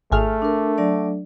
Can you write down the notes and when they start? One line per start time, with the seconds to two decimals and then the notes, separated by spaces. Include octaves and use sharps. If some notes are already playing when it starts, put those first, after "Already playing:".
0.12 G#1 A3 G#4 F6
0.42 D4 A#4
0.78 F#3 D4 D5